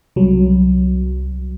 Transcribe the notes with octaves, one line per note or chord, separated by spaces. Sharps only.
C2 F#3